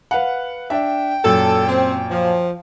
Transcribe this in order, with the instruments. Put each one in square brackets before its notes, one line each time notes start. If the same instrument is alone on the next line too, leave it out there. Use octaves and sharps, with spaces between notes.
[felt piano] B4 F5 F#5
[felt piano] D4 E5 [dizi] G5
[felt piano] F#2 A#2 [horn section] A4
[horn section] C4
F3